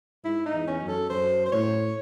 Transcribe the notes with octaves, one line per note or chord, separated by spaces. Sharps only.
G#2 E4
D#4
E2
C#4
F#2
A4
F#2 C5
C5
A2 C#5